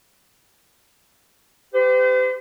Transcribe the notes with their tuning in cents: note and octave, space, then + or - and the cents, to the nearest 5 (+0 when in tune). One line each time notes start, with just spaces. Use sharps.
G4 +0 C5 -45